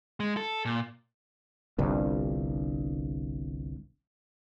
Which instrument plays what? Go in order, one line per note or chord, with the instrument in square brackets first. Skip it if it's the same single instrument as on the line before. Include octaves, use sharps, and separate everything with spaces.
[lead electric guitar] G#3
A4
A#2
[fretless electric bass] G1 C2 G2